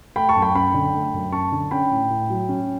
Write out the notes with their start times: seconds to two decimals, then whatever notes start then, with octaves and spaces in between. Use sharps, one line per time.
0.16 A3 G5 B5
0.29 A5 C#6
0.36 F#2
0.42 G5 B5
0.55 C#4 G5 B5
0.74 D3
0.94 A3
1.14 F#2
1.32 C#4 A5 C#6
1.52 D3
1.71 C#4 G5 B5
1.91 A2
2.10 A2
2.30 F#3
2.49 C#4